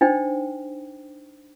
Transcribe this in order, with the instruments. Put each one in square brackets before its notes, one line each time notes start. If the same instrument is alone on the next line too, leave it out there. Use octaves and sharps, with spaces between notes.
[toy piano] D4 D#4 C5 G5